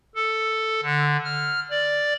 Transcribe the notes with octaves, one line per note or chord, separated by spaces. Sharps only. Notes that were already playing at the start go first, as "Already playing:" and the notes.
A4
D3
F6
D5